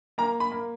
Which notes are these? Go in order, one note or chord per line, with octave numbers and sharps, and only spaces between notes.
A#3 A#5
B5
A#3